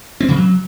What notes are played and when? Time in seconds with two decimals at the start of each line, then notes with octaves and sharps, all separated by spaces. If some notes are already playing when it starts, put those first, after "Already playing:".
0.20 C4
0.28 C#3
0.36 F#3